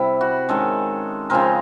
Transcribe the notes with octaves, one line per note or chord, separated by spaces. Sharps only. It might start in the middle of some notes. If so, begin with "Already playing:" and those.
Already playing: C3 G3 E4
F#4
D#3 G#3 C#4 A4
C#3 F3 G#3 C4 A#4